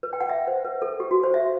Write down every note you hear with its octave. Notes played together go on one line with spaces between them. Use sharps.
B4
G5
F#5
E5
C5
B4
A4
G4
F#4
C5
E5